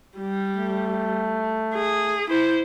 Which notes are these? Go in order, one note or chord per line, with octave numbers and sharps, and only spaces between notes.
G3
A3
G#4
E4 C5